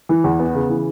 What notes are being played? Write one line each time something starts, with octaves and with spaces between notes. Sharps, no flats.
E3
E2
B3
C#3
E3